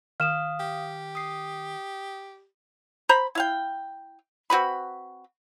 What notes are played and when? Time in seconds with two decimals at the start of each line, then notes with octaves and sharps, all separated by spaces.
0.20 D#3 F5 D#6 F6 E7
0.60 G4
1.15 D#6 C7
3.09 C5 A#5 B5
3.35 E4 F5 G5
4.50 C4 F#4 B4 B5